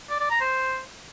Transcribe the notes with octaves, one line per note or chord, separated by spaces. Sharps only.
D5
D5
A#5
C5